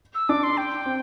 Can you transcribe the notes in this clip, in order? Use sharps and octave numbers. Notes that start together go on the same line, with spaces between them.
E6
D4 D6
C6
G5
C4